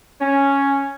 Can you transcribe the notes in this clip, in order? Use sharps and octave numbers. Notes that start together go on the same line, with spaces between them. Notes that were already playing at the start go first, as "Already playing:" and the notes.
C#4